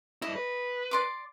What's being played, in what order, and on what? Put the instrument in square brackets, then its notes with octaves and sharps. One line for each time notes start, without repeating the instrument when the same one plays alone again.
[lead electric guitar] G2 E4 [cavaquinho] D#5
[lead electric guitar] B4
[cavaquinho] D5 C6 D6